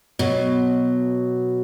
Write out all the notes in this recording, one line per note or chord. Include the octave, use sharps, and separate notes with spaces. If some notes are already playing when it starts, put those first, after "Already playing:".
B2 F#3